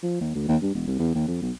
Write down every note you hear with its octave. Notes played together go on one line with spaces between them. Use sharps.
F3
D#2
D2
D#2
G2
E1
C2
E2
D#2
F2
B1